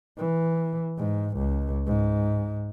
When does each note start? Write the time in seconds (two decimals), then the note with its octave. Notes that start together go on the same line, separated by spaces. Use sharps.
0.18 E3
0.98 G#2
1.38 C#2
1.86 G#2